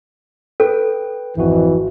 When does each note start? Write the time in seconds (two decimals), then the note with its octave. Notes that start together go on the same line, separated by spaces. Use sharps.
0.60 A4 B4 G5
1.37 G#1 F2 E3 F#4